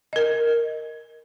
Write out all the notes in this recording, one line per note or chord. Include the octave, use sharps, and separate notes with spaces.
A#4 D#5